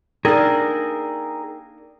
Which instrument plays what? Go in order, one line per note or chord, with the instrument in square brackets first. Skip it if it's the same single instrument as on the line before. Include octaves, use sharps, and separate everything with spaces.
[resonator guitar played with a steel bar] A#3 D4 [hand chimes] D#4 G5 E6 [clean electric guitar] G#4 A#4